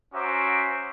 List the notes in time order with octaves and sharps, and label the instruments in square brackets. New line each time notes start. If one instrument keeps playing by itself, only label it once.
[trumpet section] C#4 F#4 C5 E5 A#5 D6